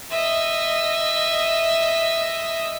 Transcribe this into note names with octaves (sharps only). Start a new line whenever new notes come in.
D#5 E5